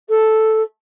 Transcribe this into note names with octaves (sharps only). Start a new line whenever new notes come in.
A4